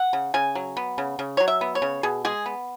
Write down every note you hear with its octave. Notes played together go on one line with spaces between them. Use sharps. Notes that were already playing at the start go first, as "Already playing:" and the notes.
Already playing: F#5
C#3
C#3 G#5
F#3
B3
C#3
C#3
F#3 C#5
E5
B3
C#5
C#3
B2 G#4
G#3 G#4
B3